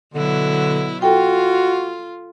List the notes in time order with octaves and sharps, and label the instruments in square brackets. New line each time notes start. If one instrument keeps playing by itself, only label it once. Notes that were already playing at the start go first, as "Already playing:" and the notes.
[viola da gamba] B2 F#3 E4 [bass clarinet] D3
[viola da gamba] F4 [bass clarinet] F#4 [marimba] A4 G5